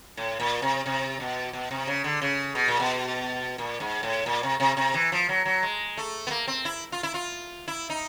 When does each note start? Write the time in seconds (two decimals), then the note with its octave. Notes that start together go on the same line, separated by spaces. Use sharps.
0.17 A2
0.40 A#2
0.62 C3
0.86 C3
1.20 B2
1.53 B2
1.71 C3
1.87 C#3
2.04 D3
2.22 C#3
2.55 B2
2.68 A#2
2.80 B2
3.58 A#2
3.80 G#2
4.03 A2
4.26 A#2
4.43 C3
4.60 C3
4.77 C3
4.94 E3
5.12 F3
5.29 F#3
5.45 F#3
5.63 G#3
5.97 A3
6.27 B3
6.31 A#3
6.48 C4
6.65 E4
6.92 F4
7.03 E4
7.14 F4
7.68 E4
7.90 D#4